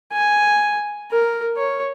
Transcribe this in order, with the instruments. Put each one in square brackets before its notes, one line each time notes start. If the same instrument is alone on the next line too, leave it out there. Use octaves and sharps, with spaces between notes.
[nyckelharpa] G#5
A#4
C#5